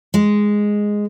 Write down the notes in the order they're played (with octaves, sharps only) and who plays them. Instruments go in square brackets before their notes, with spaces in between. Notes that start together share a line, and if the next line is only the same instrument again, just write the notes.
[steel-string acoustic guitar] G#3